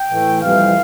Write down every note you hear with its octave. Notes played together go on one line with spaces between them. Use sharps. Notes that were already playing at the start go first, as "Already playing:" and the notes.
Already playing: G5
A2 E3 A3
F2 C3 E3 G3 F5